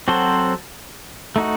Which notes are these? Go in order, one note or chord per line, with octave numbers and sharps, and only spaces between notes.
F#3 C4 F#4 A4 C5
A3 D#4 F#4